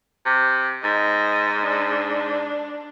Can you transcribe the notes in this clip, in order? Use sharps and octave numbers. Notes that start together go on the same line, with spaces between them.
C3
G#2 D#5
D4